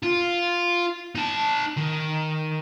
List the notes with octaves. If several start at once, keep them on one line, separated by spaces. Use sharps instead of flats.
F4
D#4 A5
D#3